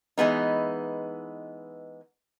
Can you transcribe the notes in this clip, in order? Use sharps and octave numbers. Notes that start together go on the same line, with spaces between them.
E3 G#3 B3 D#4